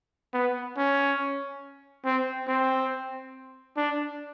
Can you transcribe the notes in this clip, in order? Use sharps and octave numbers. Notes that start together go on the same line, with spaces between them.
B3
C#4
C4
C4
D4